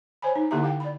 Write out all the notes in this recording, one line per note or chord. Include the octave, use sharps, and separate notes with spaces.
C5 C#5 G#5 B5
D#4
D3 A#3 E4 G4 E5 A#5
G4 F5 G5
D5 B5